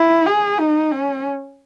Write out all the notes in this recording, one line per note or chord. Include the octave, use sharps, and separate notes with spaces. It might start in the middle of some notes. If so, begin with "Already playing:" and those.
Already playing: E4
G#4
D#4
C#4